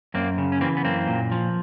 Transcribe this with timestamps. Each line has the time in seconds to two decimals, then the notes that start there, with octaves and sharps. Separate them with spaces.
0.14 F#2 A#3 C4
0.38 C#3
0.52 C#4
0.61 E3 A#3 C4
0.77 B3
0.84 F#2 A#3 C4
1.08 A#2
1.32 F3